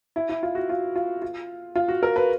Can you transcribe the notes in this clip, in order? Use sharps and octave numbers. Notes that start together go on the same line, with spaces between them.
E4
E4
F4
F#4
F4
F4
F4
F4
F#4
A#4
B4